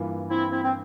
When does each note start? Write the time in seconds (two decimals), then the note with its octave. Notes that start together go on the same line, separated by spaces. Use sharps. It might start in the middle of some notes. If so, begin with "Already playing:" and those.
Already playing: G2 E3 A#3 F4
0.30 C4 E4
0.51 C4 E4
0.63 C4